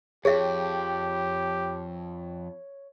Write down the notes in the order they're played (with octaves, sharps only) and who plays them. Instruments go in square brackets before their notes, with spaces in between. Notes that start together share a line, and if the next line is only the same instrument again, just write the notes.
[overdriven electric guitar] F2 [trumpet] G4 [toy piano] G#4 E5 [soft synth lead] C#5